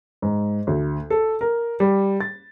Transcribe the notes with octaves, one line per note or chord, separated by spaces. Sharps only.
G#2
D2
A4
A#4
G3
A6